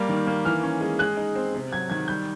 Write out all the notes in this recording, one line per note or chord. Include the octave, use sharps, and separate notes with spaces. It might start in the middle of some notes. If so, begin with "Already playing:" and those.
Already playing: G3 A#3
D#3
A#3
E3 F6
C#4
G#3
G#3 F#6
D#4
C4
C3
F#3 G#6
D#3 G#6
G3 G6